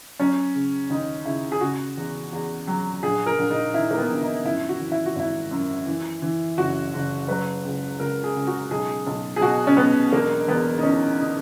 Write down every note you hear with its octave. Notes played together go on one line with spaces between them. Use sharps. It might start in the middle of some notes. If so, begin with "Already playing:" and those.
F#3 C#4
C#3
D#2 D#4
C#3 E4
G#4
C#3 F#4
E2
E2
F#3
A#1 G#4
A#4
A#1
D#4
D#3 E4
A#3
B3
A#1
D#4
F#2 E4
F#4
E3
E4
F#4
G#1 E4
F#2
E3
E3
F#1 F#4
F#1
F#3 B4
C#2
C#2 A#4
G#4
C#2
F#4
B1 G#4
B1
G#4
B2 F#4
C#4
B1 B3
E1 A#3
E2 B3
D#4
E3 C#4
D#4